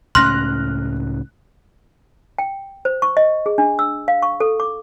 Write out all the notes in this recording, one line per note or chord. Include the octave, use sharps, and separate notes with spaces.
C#2 A2 C#4 C6 F6 F#6 A#6
G5
C5
C#6
D#5
G#4
D4
E6
F5
C#6
A4
D6